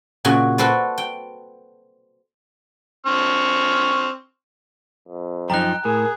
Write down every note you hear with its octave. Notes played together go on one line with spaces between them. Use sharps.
A#2 C#3 F#4
F#4 A4 B4 C5 D5
G5
C4 C#6 F6
F2
F#2 F3 D#4 G5 A#5 F#6
A2 G#4 A#4